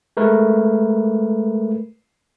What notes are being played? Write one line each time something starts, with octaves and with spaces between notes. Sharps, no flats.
G#3 A3 A#4 B4